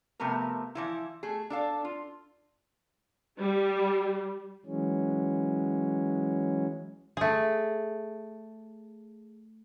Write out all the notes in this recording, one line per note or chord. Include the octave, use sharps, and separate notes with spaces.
C3 F3 A3 B3 A#4
E3 F3 E4
A3 G#4
D4 A4 F5
F4
G3
E3 F#3 G#3 C#4
A3 G#4